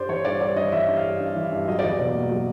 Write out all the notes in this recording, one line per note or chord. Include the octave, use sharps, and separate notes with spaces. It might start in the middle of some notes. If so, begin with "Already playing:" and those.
Already playing: G2 G3 C5 D5
E3 C#5
G2 D5
G3 D5
G2 D#5
E3 E5
G2
F5
G3
G2
E3
G2
F#3 D#5
D5
E2 D#5
B2 D5
A#3
F#3